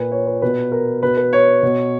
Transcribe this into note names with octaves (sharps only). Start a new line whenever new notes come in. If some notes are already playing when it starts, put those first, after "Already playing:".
Already playing: A#2 B4
C#5
B4
B2 B4
A#4
B2 B4
B4
C#5
B2